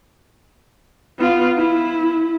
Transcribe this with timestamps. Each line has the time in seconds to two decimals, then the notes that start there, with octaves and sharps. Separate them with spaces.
1.19 B3 F4
1.57 E4